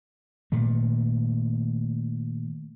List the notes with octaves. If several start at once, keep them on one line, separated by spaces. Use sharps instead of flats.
A#2 D#3 A3